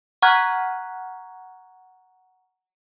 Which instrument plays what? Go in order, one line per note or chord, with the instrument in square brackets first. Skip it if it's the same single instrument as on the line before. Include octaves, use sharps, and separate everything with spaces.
[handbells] F#5 A#5 C#6 F6 F#6 G#6